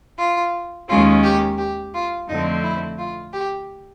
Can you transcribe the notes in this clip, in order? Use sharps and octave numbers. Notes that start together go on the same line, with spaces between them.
F4
D#2 D#3 G#3 C#4 F4
G4
G4
F4
F2 D3 F3 A3 C4 D#4
E4
F4
G4